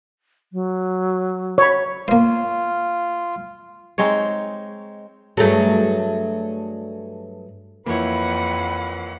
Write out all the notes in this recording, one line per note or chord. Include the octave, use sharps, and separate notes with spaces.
F#3
C#5 B5
A#3 F4 C5
G#3 C4 D#4 C#5
G2 F#3 A3 G#4 A4
F2 E3 F3 A#3 E4 B4 C#5 F#5